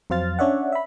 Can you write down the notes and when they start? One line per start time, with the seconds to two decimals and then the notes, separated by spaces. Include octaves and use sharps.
0.10 F2 F#3 C5 F5 F6 A6
0.39 C#4 D4 C#5 D5 E5 F#5
0.72 E5 B5